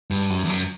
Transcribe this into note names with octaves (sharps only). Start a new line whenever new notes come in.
G2
F#2
E2
F#2